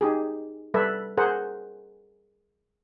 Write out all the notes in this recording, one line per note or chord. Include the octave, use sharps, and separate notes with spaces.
D#4 G4 G#4
G3 A4 B4 E5
G#4 A#4 C5 F#5